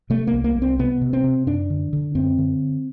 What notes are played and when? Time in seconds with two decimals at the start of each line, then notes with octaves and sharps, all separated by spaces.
0.10 C3 A3
0.27 A#3
0.33 C2
0.44 A#3
0.57 C2
0.62 C4
0.79 C3 B3
1.01 C3
1.13 C4
1.24 C3
1.47 F#2 D4
1.70 D3
1.93 D3
2.15 F#2 C4
2.38 D3